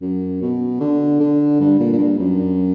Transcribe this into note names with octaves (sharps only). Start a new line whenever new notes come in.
F#2
B2
D3
D3
G2
A#2
A#2
G2
F#2